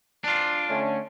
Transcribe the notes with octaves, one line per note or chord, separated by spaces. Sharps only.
D4 F4
D3 A3 C#4